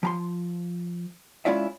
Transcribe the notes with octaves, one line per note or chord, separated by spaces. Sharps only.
F3 A#5 C6
G#3 C#4 E4 F4 D5 E5